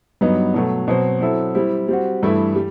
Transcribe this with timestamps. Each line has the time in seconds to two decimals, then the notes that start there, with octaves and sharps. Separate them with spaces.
0.21 G2 F#3 B3 D#4
0.54 B2 F#3 A3
0.88 B2 F#3 C4 F#4 C5
1.21 F#3 C4 E4 A4 E5
1.55 G3 C4 E4
1.88 G3 C4 F#4
2.23 G2 E3 A3 E4
2.55 G3